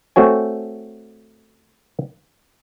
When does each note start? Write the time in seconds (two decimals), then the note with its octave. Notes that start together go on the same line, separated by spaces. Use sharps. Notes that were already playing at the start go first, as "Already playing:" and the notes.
0.16 A3 C4 F#4 C#5 G#5